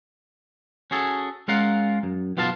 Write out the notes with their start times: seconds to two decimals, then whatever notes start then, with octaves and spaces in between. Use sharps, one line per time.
0.91 C#4 F#4 G#4 A4
1.48 G#3 C#4 F4 A#4 F5 F#5
2.03 F#2
2.37 B1 B3 F4 F5 A5